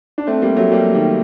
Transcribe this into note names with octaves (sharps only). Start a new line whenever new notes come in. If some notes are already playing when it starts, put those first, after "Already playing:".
D4
A3 C4
G3 A#3
F#3 A3
G3 A#3
D#3 G3